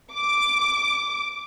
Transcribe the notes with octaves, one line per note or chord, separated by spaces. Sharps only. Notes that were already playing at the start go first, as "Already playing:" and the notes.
D6